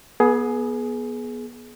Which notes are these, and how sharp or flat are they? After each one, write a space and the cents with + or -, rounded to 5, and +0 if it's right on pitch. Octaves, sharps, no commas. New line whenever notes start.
B3 -25 G#4 +20